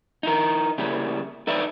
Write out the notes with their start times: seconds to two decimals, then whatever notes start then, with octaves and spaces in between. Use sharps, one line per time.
0.23 D#4 E4 A#4
0.78 C#3 G3 A#3 E4
1.47 D#4 A4 B4 D5 E5